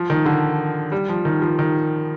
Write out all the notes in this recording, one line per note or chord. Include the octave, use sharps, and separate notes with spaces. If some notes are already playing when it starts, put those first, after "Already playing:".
Already playing: F3
D#3
D3
G3
F3
D#3
F3
D#3